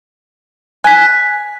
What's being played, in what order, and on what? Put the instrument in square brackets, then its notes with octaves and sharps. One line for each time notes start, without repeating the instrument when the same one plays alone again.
[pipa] G#5 [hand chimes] F#6 B6